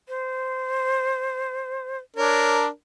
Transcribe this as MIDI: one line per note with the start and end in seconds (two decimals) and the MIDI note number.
0.08 1.99 72
2.17 2.67 62
2.17 2.67 70
2.17 2.56 73